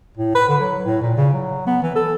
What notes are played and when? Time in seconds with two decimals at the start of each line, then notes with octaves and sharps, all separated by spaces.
0.17 A2
0.35 B4
0.49 D3
0.60 F#3
0.85 A2
1.02 A#2
1.17 C#3
1.33 F#3
1.67 B3
1.82 E3
1.96 A4